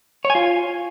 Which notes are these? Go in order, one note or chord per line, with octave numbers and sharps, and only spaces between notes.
C#5
G#5
F4